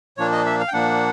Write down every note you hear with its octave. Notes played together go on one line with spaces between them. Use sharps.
A#2 F3 A#3 D4 C#5
D#5
E5
F5
G5
A#2 F3 A#3 D4 F#5